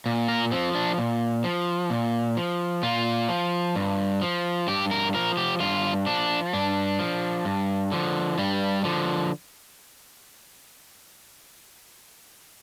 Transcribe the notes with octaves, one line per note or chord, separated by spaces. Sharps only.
A#2
A#4
F3 C4
D4
A#2
F3
A#2
F3
A#2 F4
F3
G2
F3
G2 G4
A#4
F3 A#4
G4
G2 F4
F3 D4
G2 D4
F3
G2
D3 F3
G2 G3
D3 F3